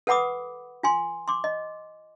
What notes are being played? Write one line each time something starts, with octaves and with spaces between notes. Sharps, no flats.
A4 B4 F#5 B5 D6 D#6
F4 G#5 C6
C6 D6
D#5